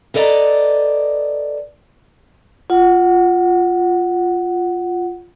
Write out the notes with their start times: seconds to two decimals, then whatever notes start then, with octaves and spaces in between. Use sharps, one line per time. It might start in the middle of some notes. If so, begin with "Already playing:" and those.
0.14 A4 B4 D5 D#5 A#5
2.70 F4 F#5